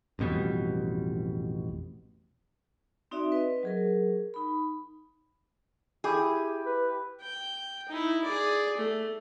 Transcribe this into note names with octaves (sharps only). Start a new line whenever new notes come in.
A1 F2 B2 G3
C4 D#4 F#4 D5 E5
B4 D#5
F#3 G#4 A#4
D#4 B5
E4 G4 G#4
B4
G5
D#4 E4
G#4 D5
A3